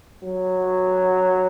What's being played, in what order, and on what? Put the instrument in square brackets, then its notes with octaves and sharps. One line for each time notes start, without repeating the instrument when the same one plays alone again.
[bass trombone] F#3